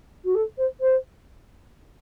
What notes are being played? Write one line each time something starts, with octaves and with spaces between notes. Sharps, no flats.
F#4
A4
C5
C5